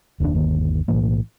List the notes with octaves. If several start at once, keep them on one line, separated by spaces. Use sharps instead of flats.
F1 D#2 A#2 D4
G1 D#2 D#3 A#3
B1 A2 E3 A#3